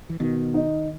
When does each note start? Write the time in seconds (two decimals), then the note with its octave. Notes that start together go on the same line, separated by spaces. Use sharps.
0.10 E3
0.20 B2 D#3
0.54 D#4